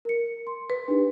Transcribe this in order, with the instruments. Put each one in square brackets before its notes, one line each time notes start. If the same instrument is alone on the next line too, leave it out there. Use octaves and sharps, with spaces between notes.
[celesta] A#4 C#7
C6
[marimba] B4
[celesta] D4 D#4 G4